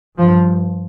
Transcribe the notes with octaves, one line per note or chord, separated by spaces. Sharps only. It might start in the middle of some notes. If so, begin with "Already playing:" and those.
G2 F3